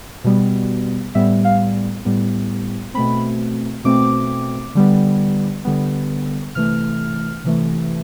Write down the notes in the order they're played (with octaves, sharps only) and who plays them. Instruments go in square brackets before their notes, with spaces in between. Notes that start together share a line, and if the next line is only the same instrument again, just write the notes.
[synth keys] B2 G3 B3
A2 G3 B3 E5
F5
A2 G3 B3
B2 A3 C4 B5
B2 A3 C4 D6
D3 G3 B3
D3 G3 B3
C3 E3 A3 F6
C3 E3 A3